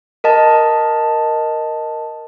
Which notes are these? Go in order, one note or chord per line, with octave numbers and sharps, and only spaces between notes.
A#4 D#5 A5